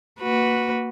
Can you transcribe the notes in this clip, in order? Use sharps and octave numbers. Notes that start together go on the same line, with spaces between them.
A#3 F#4 B4